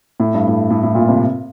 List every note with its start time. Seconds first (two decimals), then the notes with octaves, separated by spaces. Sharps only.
0.20 A2
0.34 G2
0.48 A2
0.70 A2
0.83 A2
0.95 A#2
1.08 C3